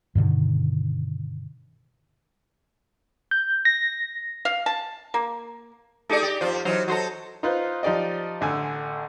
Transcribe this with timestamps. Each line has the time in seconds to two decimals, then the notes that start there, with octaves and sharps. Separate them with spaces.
0.15 G2 B2 D3 D#3
3.31 G6
3.65 A#6
4.45 F5
4.66 A5
5.14 A#3
6.09 A3 D#4 G4 G#4 D5 D6
6.23 G4 D5 A#6
6.41 F2 F4 C5 D5
6.65 E3 F#3 D#4 C5 F6
6.88 F#3 D#4 E4 A4 C5 A#6
7.43 D#4 F4 B4 C5
7.83 F3 D#4 G4 D5 D#5
8.41 A1 D3 G#5 E6